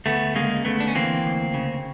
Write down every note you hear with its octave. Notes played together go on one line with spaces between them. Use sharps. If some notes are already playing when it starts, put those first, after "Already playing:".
D2 A3 B3
C#3 G#3 A#3
D2 A3 B3
D4
C#4
E3 A#3 C4
D2
C#3